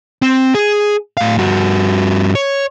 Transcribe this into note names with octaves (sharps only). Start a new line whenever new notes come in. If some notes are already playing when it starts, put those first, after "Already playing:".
C4
G#4
A2 F5
G2 F#4
C#5